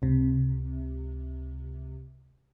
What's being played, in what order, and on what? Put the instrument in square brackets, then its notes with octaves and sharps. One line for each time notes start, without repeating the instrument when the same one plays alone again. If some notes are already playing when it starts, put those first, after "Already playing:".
[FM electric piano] C#2 C3